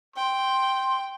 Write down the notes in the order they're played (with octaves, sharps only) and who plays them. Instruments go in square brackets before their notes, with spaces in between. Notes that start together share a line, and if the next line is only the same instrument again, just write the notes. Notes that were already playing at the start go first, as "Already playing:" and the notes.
[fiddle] G5 [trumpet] C6